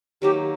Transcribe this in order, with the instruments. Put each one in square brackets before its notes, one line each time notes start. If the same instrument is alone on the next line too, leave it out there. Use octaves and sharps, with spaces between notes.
[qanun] D#3 F#3 A#3 [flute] G4